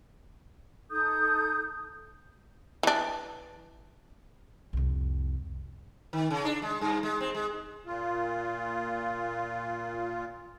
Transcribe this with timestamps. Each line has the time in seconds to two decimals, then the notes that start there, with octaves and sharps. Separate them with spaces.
0.90 D#4 A4 D#6 G6
2.83 E3 D4
4.73 C2 F2
6.13 D#3
6.30 C#3
6.45 D4
6.62 G#3
6.81 G2
7.03 G#3
7.21 C4
7.35 G#3
7.86 A#2 F4